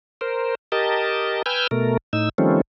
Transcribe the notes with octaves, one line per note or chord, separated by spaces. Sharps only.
A#4 C5
G4 A#4 D#5 A5
B4 G5 G#5 E6 F6 G6
B2 A3 A#4
A2 D#4 E6
D#3 F3 G3 A3 C4 C#4